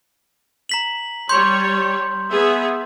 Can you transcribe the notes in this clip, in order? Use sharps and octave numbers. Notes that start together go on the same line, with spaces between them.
A#5 B6 F#7
G3 C#5 C6 G6
B3 G#4 E5